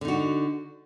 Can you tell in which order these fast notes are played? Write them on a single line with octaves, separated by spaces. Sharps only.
D3 D#4 F#4